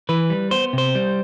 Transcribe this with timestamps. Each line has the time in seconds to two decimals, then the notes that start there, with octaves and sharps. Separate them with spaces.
0.09 E3 B4
0.30 G3
0.51 B3 C5
0.73 C3 C5
0.95 G3